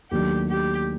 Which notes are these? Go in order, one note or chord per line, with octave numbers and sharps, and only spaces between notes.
D#2 D#3 F#3 A3 D4 G4
G4